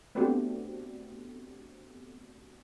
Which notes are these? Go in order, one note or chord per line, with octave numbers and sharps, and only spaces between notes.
A3 B3 C4 D4 F#4 G4